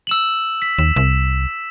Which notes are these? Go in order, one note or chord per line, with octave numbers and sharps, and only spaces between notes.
E6 E7 F#7
B6
D#2 E7
C2 E7